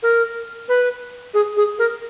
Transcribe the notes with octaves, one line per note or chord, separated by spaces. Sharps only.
A#4
B4
G#4
G#4
A#4